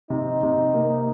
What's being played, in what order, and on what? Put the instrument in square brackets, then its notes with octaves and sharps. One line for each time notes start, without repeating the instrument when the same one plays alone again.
[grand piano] C3 [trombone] D#4
[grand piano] C3
A#3